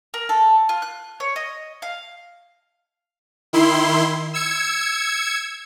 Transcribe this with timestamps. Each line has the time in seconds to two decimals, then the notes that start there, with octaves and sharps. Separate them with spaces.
0.14 A#4
0.29 A4
0.69 F4
0.82 F#6
1.20 C#5
1.36 D#5
1.82 F5
3.53 D#3 E4 C6
4.34 E6 G#6 C#7